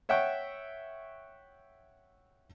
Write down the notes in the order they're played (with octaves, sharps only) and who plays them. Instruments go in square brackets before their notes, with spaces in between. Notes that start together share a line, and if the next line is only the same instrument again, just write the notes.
[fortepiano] C#5 E5 F#5 G5 C#6